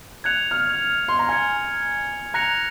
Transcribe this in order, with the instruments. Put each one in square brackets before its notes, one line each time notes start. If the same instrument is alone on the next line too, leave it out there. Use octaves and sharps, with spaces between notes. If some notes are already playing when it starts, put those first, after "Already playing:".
[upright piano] F#6 [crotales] G#6 C#7 F7
[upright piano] F6
C6
A#5
[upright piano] G#5 [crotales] F6 G#6 C#7
[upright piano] A#5 [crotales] F#6 A#6 C#7 F7